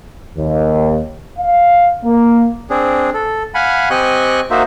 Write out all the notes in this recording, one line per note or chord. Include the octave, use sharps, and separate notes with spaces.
D#2
F5
A#3
C4 D4 G#4
A4
F5 F#5 G#5 B5
C4 G4 D#5 G#5 C#6 F#6
A#3 D#4 F#4 C5 E5